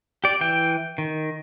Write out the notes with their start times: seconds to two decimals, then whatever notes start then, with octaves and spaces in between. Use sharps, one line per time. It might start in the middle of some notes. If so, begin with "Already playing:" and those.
0.24 G4 D5
0.41 E3 G5
0.98 D#3